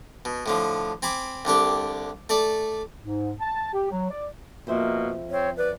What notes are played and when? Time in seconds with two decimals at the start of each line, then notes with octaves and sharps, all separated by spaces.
0.25 B2
0.46 A2 D3 F3
1.02 C4 G#5 B5 D6
1.45 C2 D3 D4 G4
2.29 A3 A4 D5
3.02 G#2
3.40 A5
3.73 G4
3.91 F#3
4.10 D5
4.67 F2 B2 A#3 C5 E5
5.31 C4 C#5
5.57 B4 D5